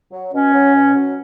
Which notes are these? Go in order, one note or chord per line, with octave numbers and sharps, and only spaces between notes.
F#3
B2 C#4
F#3
B2
F#3